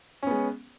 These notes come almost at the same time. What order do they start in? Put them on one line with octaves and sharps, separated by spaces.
C#4 B3 G#3